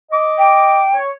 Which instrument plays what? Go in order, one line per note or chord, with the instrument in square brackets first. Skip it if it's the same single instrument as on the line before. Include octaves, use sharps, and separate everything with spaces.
[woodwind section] D#5 D6
[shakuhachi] G5
[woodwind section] C#5